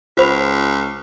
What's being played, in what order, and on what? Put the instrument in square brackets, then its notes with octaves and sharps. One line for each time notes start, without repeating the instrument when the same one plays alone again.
[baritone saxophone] C#2 [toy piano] F4 C5 B5